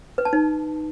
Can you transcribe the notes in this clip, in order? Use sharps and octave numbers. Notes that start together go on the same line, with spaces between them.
B4
A5
D#4